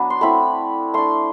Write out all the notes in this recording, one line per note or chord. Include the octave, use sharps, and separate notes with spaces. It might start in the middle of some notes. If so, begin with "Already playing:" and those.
Already playing: F#3 B3 D4
C6
A3 C4 E4 B5
A3 D4 C6